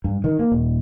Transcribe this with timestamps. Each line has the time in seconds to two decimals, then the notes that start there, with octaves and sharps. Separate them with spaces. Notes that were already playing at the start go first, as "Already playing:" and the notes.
0.04 G2
0.24 D#3
0.39 A#3
0.52 D#1